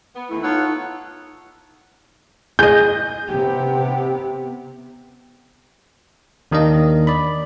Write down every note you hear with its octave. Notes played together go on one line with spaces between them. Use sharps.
B3
D#2 E3 A3 E4
B3 D#4 F4 A4 C#5 F#5 E6
G#4 D#5 G6
C3 B3 G4
D#2 D#3 A#3 D4 D#5
D5 B5